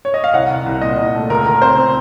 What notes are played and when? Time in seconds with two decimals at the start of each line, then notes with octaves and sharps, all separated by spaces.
0.05 C#5
0.14 D#5
0.24 F5
0.33 C2 F#5
0.50 C2
0.66 C2
0.81 A#2 D#5
0.98 C2
1.14 A3
1.30 C#2 A#4
1.46 C#2 A#4
1.62 C4 C5
1.78 C4